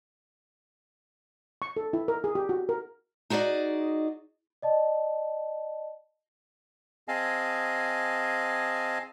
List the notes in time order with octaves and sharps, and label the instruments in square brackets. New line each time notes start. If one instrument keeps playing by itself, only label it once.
[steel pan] C#6
A4
E4
A#4
G#4
G4
F#4
A#4
[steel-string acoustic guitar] D#4 F#4 G#4 D5 D#5
[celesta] D5 D#5 A5
[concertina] C4 G#4 D#5 F5 G#5 A5